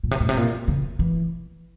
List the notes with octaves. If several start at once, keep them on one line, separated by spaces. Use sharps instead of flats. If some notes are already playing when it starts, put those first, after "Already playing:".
A#2
C3
A#2
C3
A#2
C#3
E3